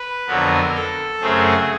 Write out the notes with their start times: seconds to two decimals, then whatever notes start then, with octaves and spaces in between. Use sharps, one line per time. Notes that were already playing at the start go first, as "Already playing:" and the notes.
Already playing: B4
0.27 F2 D3 F#3 B3 A#4
0.74 A4
1.21 F#2 C#3 F#3 A3 C4 G#4